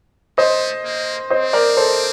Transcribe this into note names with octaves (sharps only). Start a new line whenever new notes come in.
A3 C5 D#5
A#3
C4 C5 D#5
A#4 D5
A4 C5